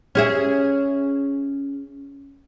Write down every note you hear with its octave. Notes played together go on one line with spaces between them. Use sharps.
C#4 G#4 E5